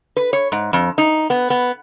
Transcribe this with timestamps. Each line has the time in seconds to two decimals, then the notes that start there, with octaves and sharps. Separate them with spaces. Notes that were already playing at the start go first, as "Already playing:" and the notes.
0.17 B4
0.33 C#5
0.52 G#2
0.73 F2
0.98 D#4
1.30 B3
1.50 B3